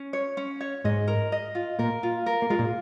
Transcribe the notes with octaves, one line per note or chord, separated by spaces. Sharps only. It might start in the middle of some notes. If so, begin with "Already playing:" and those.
Already playing: C#4
C#5
C#4
C#5
G#2 G#3 D#5
A#4
D#5
F4
A#2 A#3 A#4
F4
A#4
A#3
G#3 F4
A#2 A#3